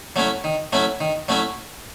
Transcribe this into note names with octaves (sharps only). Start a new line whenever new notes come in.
F#3 A3 C#4 E4
D#3
F#3 A3 C#4 E4
D#3
F#3 A3 C#4 E4